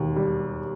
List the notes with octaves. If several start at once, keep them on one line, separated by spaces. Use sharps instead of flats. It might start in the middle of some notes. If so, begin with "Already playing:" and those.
Already playing: E1 D#2
G3